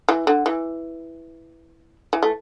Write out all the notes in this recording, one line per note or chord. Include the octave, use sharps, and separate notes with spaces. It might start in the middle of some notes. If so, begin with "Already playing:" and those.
E3
D3
E3
E3
A3